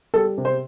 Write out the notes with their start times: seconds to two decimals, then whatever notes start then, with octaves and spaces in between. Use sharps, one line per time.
0.14 G3 A4
0.38 C3
0.45 C5